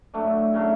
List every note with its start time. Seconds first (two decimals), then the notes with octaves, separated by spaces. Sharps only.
0.14 A2 F#3 A3 D4
0.54 C#3 F#3 A3